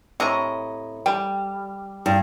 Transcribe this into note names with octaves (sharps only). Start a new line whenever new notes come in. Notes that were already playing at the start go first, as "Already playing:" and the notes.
A2 C3 D#5 A#5 C#6
G3 G5
G2